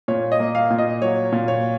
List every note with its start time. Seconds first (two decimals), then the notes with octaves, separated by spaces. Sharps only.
0.08 A#2 C#5
0.32 D#5
0.39 A#3
0.55 F5
0.70 A#2
0.78 D#5
1.01 F#3 C#5
1.32 A#2
1.48 C#5